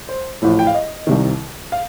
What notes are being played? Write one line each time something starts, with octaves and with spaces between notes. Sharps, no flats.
C5
A1 A2 F3
G5
F5
D#5
C2 C3 D#3
F5